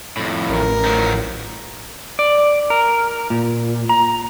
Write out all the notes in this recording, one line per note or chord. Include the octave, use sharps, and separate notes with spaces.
F2 A2
A1 A#4
D#3 F3 F#3
D5
A#4
A#2
A#5